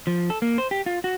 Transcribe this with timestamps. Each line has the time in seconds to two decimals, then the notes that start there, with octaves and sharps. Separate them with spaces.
0.07 F3
0.30 A4
0.42 A#3
0.58 C5
0.71 G4
0.86 F4
1.04 F#4